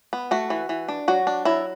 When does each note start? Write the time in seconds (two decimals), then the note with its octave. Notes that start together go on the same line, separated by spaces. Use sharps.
0.13 B3
0.31 A3 F#4
0.50 E3
0.69 E3
0.88 D4
1.08 F#3 F#4
1.27 D4
1.45 F#3 E4